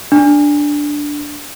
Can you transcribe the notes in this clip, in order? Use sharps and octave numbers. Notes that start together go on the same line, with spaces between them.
D4